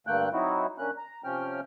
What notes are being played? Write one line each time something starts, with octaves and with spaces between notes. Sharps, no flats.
G2 D3 A3 A#3 G5 F#6
F#3 C4 D#4 E4 F#4
D3 A#3 C#4 F#6
A#5
C3 F3 C#4 G5 F6